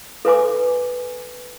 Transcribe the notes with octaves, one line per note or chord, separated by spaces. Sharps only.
A4 B4 G#5 D6